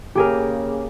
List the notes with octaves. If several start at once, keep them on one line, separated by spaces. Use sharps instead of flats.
C#3 A#3 G4 G#4 A#4